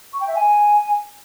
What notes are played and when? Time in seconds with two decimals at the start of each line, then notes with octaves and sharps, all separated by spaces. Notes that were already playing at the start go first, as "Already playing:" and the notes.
0.13 C#6
0.20 G5
0.28 E5
0.35 G#5